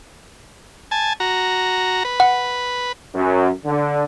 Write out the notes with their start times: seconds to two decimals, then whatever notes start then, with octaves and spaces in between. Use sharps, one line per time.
0.91 G#5 A5
1.20 F#4 A#5
2.05 B4
2.20 F#5
3.15 F#2
3.65 D3